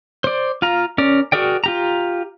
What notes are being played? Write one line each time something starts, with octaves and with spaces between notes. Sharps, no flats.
C5 D5
F4 F5 A#5
C#4 A#4 D5
F#4 G#4 A#4 D5 G5
F4 G4 A#5